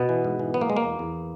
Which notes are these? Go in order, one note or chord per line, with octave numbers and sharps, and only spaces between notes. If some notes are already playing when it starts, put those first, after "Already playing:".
Already playing: B2 B3
E3
G#2
E3
F#3 B3
A#3
B2 G#3
A#3
E2
E2